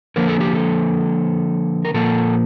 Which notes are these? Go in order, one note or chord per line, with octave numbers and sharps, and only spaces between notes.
D3 F3 A#3 A#4
A4
G4
A4
A#4
A#2 F3 A#3 A4